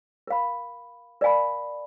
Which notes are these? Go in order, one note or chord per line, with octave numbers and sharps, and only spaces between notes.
A#4 F5 B5
A#4 D5 F5 G#5 B5